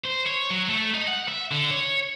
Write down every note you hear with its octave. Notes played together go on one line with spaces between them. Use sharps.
C5
C#5
F#3
A3
D#4
F#5
E5
D3
C#5